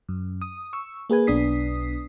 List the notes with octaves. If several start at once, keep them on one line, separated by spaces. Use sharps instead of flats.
F#2
D#6
C#6 E6
A#3 G#4 B4 G#5
B1 B3 D4 D#6 B6 C7